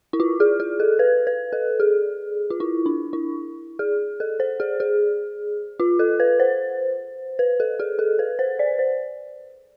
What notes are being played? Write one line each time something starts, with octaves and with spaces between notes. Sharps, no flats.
E4
F4
G#4
G#4
A4
B4
B4
A4
G#4
F4
E4
D4
E4
G#4
A4
C5
G#4
G#4
F4
A4
B4
C5
B4
A4
G#4
A4
B4
C5
D5
C5